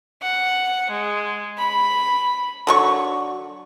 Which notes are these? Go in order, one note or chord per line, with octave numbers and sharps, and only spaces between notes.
F#5
G#3
B5
D3 F#3 C#6